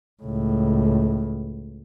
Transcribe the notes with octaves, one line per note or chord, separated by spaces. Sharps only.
C#2 A2